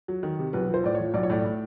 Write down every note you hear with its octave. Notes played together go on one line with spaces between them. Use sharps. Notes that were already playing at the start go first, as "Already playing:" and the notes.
F#3
D#3
C3
B1 B4
F3
C5
A2 D5
C#5
F3
B1 D5
C#5
A2 D5
A2